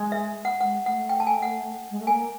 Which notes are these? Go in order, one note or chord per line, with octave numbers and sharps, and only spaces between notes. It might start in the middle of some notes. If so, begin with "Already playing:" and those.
Already playing: G#3
E5
F#5
G#3 F#5
A3 F#5
G5
A5
G#5
F#5
G#3
A3
A#3 G#5